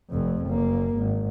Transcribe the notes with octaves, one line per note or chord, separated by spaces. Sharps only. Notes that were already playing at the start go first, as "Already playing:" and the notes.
F1 F2
F#1 A#3
G#1